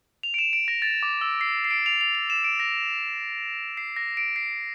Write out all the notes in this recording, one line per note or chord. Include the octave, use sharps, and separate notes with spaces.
F7
D7
E7
D7
A#6
A6
D6
E6
C7
C7
D7
F7
F7
F7
E7
D7
A#6
C7
A#6
D7
C7